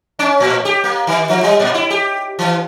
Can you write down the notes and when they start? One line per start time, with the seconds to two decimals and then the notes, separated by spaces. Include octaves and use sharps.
0.19 C#4
0.40 A2
0.65 G4
0.84 A#3
1.07 D#3
1.29 F3
1.43 G3
1.60 A#2
1.74 E4
1.90 G4
2.39 E3